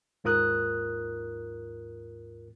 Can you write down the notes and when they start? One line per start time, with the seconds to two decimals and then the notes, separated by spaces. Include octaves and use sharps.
0.24 D#2 G#2 F4 A#4 D#6 F#6